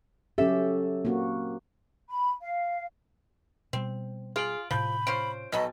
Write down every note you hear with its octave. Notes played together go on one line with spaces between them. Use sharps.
F#3 C#4 G4 A4 E5
A#3 C4 F#4
B5
F5
B2 G3 C4
F4 G#4 D7 F#7
A2 C3 F3 B5 G6
C#4 F4 C5 D7
B1 F#3 B3 A4 D#5